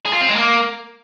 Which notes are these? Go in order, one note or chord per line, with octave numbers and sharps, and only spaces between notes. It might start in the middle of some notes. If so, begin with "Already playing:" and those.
G#4
F4
C4
G#3
A#3